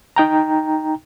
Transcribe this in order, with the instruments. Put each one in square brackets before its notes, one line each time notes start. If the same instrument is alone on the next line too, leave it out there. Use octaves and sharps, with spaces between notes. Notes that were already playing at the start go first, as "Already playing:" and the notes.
[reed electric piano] D#4 G5 A#5